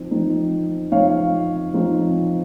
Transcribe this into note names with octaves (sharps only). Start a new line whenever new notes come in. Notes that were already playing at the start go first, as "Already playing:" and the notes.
Already playing: F3 C4 D#4
F3 C4 D#4
F3 C4 D#4 C#5 F5
F3 C4 D#4